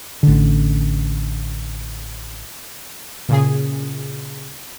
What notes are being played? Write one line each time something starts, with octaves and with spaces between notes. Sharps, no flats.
A1 D3
A#2 C#3 G#4